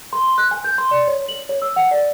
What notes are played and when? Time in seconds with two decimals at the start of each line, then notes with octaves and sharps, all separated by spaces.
0.13 C6
0.38 F#6
0.51 G#5
0.64 G6
0.78 C6
0.91 D5
1.07 C#5
1.28 F#7
1.49 C#5
1.62 E6
1.76 F#5
1.91 D5